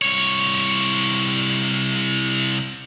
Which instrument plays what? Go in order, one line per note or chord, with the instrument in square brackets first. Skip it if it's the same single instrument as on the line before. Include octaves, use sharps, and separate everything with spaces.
[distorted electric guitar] C2 C#5